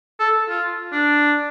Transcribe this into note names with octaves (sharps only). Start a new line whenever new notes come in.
A4
F4
D4